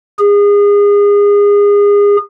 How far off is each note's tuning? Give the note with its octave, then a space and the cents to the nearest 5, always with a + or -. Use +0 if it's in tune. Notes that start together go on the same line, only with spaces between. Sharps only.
G#4 -30